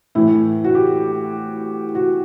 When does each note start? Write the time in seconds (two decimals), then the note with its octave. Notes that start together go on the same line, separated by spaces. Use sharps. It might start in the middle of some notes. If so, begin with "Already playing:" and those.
0.15 A2 E3 E4
0.64 F#4
0.75 G4
1.95 F#4